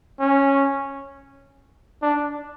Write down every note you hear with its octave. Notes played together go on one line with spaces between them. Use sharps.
C#4
D4